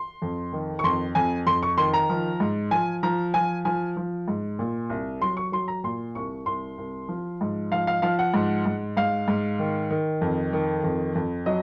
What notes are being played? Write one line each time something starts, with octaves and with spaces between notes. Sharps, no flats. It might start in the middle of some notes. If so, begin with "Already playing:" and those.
Already playing: C6
F2
D#3
C#6
F2 C6
F2 G#5
F2 C6
C#6
D#3 C6
A#5
F3
G#2
F3 G#5
F3 A#5
F3 G#5
F3 G#5
F3
G#2
A#2
C2
F#3 C6
C#6
F#3 C6
A#5
A#2 C6
C2 C#6
C2 C6
C2
F3
G#2
F3 F5
F5
F3 F5
F#5
G#2
G#2
G#2 F5
G#2
D#3
D#3
F2
D#3
F2
F2
F#3 D#5